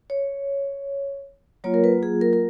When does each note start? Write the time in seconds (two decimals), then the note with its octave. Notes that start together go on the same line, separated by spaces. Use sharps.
0.10 C#5
1.64 F#3 A#3 F4 C#5
1.74 A#4
1.84 B4
2.03 G#4
2.21 A#4
2.33 A#4